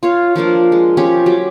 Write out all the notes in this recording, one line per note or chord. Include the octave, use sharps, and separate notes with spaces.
F4 C#5 F5
F3 A#3 D4 A#4
G#3
F3 C#4 G4 C#5
F#3 G4